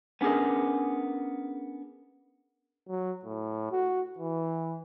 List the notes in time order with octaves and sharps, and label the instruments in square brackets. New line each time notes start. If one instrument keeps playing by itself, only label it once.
[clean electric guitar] B3 C#4 D4 G#4 A#4
[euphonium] F#3
A2
F#4
E3